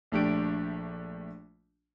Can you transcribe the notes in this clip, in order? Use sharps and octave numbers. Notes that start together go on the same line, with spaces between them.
A#1 A3 D4 G4 D7